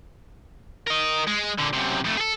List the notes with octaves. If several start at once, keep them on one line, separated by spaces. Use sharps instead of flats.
A#4 D#5
G#3
A#2 D3
F#2 C3
F2 A3
G#4 A4